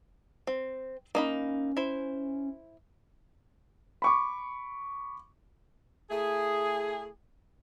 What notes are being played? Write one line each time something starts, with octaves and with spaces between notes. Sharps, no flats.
C4
A#3 C#4 D#4 B5
E4 C5
B5 C#6 D6
A3 E4 G#4